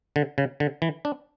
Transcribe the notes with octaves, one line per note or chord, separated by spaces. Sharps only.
D3
C#3
D3
E3
D4